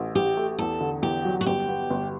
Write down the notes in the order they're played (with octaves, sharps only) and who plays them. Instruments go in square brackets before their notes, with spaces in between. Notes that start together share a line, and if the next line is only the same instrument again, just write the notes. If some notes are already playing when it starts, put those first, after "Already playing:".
Already playing: [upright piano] A1 A3
[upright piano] A1 [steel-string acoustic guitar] G4
[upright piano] A3
[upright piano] E2 [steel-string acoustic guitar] A4
[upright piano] D3
[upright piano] E2 [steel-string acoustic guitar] G4
[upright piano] F#3
[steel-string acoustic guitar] F#4
[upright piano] G1 [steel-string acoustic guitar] G4
[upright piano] B3
G1